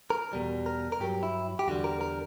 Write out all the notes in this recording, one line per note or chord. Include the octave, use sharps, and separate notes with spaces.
A#4
E2 B2 G3
A#4
A#4
G2 F#3 G4
E4
G4
E2 D3 G3 F#4
A#4
A#4